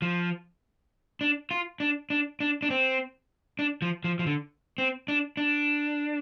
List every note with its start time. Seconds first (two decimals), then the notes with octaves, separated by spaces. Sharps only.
0.02 F3
1.21 D4
1.51 F4
1.80 D4
2.10 D4
2.40 D4
2.63 D4
2.70 C4
3.59 D4
3.82 F3
4.04 F3
4.19 F3
4.26 D3
4.78 C4
5.08 D4
5.37 D4